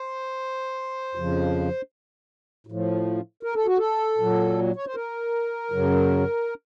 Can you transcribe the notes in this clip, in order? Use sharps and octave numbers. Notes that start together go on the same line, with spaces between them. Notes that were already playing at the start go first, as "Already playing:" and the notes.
Already playing: C5
F2 C#3 F3
A2
F3
A#4
A4
F#4
A4
A#2 F#3
C#5
C5
A#4
F#2 C#3 F#3